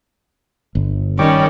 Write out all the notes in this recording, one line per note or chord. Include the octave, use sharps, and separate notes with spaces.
G1
D#3 G3 C#4 C#5 D5